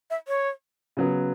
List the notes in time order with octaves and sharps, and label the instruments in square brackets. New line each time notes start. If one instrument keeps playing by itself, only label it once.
[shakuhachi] E5
C#5
[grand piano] C#3 F#3 B3